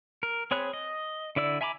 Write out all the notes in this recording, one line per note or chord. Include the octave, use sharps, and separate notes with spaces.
A#4
C4 G#4 C#5 B5 F#6
D#5
D3 E4 D5 E6
E5 G#5 A#5 B5 D6